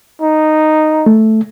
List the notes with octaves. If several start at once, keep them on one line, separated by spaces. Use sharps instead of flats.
D#4
A3